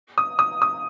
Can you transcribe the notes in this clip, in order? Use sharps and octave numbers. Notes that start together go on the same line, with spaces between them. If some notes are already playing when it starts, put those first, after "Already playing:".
D#6
D#6
D#6